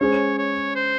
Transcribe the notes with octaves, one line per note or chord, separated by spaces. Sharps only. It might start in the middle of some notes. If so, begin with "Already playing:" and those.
G#3 C#4 G#4 C5 C#5
C#5
C5